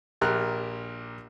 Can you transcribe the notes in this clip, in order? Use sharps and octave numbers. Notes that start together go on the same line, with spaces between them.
A#1 G4 A#4 F6 F#6